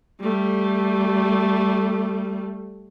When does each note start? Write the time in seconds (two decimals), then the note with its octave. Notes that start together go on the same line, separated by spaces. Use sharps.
0.21 G3 A3